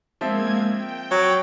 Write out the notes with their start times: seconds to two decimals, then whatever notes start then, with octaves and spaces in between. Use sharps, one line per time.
0.21 F3 G#3 A#3 C4 E5 G#6
0.69 G5
1.11 F#3